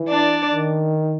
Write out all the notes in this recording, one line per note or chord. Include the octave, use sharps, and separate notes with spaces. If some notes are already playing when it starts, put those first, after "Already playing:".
Already playing: E3
D4 D5
D#3